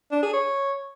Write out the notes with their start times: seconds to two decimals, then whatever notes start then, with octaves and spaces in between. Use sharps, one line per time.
0.12 D4
0.22 G#4
0.33 C#5